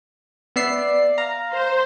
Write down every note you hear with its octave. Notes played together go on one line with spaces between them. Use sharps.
B3 D5 E5 C7
F5 A#5
C5